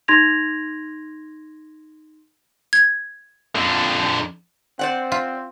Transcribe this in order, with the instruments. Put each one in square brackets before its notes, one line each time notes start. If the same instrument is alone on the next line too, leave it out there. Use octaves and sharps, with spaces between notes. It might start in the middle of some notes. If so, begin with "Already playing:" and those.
[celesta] D#4 C6 G#6 A#6 F7
[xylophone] G#6
[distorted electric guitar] F2 D3
[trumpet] C4 [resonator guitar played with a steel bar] C5 D5 F#5
[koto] F4